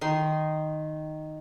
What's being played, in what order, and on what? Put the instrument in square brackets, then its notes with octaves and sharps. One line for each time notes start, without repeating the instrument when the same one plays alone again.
[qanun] D#3 D#4 C6